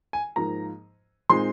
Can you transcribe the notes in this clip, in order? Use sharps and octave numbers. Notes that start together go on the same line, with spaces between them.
G#5
G#2 F3 A#3 A#5
A#2 G#3 C4 D#4 C6